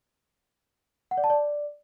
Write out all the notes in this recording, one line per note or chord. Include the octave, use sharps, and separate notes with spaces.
F#5
D5
A5
D5